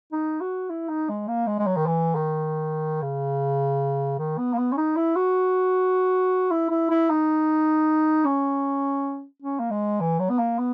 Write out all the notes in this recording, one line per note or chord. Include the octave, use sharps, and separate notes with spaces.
D#4
F#4
E4
D#4
G#3
A#3
G#3
G#3
F#3
D#3
E3
D#3
C#3
D#3
B3
A#3
B3
C#4
D#4
E4
F#4
E4
E4
E4
D#4
C#4
C#4
A#3
G#3
E3
F#3
B3
A#3
B3